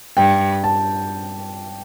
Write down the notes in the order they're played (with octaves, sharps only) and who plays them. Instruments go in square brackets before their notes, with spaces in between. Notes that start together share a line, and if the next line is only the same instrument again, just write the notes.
[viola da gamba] G2 [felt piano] G5
[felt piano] A5